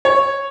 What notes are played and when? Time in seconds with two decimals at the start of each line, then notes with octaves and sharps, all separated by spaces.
0.05 C#5